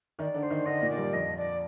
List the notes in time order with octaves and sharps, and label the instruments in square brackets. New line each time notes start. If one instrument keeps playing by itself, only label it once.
[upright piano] D#3 D#4 [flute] D5
[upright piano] D3 D4
[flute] C5
[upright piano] D#3 D#4
[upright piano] D3 D4 [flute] D#5
[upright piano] A#2 A#3
[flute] D5
[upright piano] G2 G3
[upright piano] F2 F3 [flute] D#5
[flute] D5